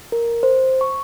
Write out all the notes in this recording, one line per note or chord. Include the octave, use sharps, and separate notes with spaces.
A#4
C5
C#6